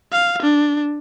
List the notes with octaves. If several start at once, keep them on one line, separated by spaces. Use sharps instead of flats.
F5
D4